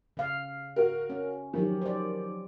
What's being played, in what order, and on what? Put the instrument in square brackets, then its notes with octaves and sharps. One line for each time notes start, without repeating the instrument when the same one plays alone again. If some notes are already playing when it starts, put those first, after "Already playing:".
[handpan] C#3 F5
[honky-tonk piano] F#4 A#4
[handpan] C#4
[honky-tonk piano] D#3 [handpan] F3 F#3 G4
[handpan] C5 D5